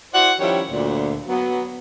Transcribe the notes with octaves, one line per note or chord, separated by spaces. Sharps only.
E4 F#4 C5 D5 F#5
D#3 F3 G3 C#4 E4 C#5
D2 A#2
F#3 B3